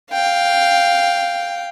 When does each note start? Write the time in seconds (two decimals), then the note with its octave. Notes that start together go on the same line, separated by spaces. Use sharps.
0.12 F5 G5